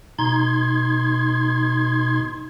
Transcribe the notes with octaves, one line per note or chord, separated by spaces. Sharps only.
B2 D#4 C6 G#6